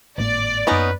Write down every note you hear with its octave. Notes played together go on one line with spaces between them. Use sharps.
G#1 A2 A#3 D5
F#2 A#3 B3 C#4 D#4 B4